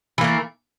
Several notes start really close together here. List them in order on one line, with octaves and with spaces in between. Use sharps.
E3 A#3 A3